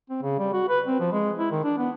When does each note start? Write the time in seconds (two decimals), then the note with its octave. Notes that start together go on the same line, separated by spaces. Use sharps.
0.10 C4
0.22 C#3
0.39 G3
0.53 F#4
0.68 B4
0.87 C4
1.00 F3
1.12 G#3
1.38 E4
1.52 D#3
1.64 D4
1.78 B3